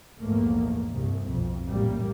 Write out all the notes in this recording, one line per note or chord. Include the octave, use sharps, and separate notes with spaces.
A#1 E2 G#2 A3 A#3
C2 G2 C3
B1 F2
A1 A#2 G3 A#3